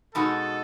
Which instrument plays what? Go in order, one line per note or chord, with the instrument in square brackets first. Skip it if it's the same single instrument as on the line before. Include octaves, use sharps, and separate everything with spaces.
[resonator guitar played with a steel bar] B2 G#3 D#4 F#4 [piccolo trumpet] A4